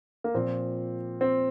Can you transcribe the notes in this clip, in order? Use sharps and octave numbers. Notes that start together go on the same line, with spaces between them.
A#3
A#2 F3 C4
C4